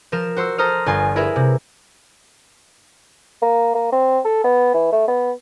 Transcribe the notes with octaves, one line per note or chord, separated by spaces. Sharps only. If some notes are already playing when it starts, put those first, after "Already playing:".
F3 A#4 E7
F#4 C5 C6 E6
A4 C5 A#5 C6 D#6 F6
G1 F4 G#5 C6
E4 G#4 A#4 B4 E5
C3
A#3
A#3
C4
A4
B3
E3
A3
B3